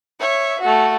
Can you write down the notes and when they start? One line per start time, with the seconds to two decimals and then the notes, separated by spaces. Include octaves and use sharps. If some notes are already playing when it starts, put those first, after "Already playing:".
0.20 C#5 E5
0.61 A3 F#4